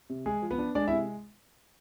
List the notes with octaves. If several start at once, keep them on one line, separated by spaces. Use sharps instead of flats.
C3
G#3 G#4
F3
B3 B4
D4
G#3 D4 D5
E4 E5
C3